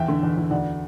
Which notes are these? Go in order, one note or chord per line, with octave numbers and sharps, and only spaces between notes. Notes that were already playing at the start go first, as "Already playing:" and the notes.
Already playing: E2 E5 G5
D3
E2
E2
D2 D5 F#5